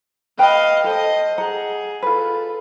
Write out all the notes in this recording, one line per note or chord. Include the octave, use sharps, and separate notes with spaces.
B4 D#5 F5 G5 B5
A4 C5 D#5
G#4 F#5 A#5
F4 A4 B4